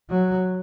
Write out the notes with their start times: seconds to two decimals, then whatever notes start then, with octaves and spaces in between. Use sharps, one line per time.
0.10 F#3